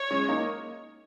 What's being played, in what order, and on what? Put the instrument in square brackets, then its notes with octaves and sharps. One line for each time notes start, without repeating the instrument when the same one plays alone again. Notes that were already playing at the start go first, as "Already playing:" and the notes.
Already playing: [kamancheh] C#5
[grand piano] G#3 C#4
A#3 D#4